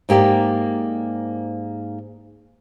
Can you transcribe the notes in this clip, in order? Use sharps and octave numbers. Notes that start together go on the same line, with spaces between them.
G#2 A#3 G4 G#4 D5